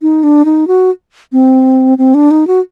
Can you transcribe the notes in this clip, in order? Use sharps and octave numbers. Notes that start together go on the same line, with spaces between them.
D#4
D4
D#4
F#4
C4
C4
D4
D#4
F#4